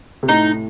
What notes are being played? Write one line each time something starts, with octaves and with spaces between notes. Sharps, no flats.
C3
A2 D#4